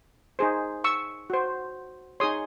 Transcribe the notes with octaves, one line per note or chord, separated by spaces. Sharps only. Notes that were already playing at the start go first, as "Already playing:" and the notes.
D#4 G#4 C5
C#6 E6
F#4 C5
D#4 G#4 C#5 C6 D#6